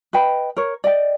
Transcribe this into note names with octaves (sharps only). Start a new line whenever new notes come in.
B4 D#5 G5 B5
A#4 C#5
D5 D#5 G5